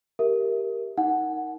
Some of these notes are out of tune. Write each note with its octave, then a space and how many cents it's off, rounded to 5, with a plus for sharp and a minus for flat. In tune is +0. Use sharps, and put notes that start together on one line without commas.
G4 +0 A#4 +0 E5 +0
D#4 +15 F#5 +0